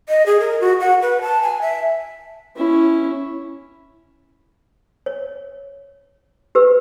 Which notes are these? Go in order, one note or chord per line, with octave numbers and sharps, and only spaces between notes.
D#5
G#4
A#4
F#4
F#5
B4
A5
G#5
E5
C#4 E4
C#5
G4 B4 E6